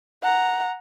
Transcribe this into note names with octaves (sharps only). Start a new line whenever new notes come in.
F#5 A#5